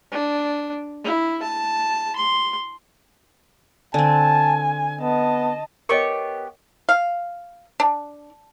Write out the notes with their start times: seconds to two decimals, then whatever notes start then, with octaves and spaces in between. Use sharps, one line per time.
0.12 D4
1.05 E4
1.43 A5
2.16 C6
3.94 D3 C4 G#5 A5
5.01 B3 D#5 A5
5.89 B3 G4 A#4 C#5 D#5 C#6
6.89 F5
7.80 D4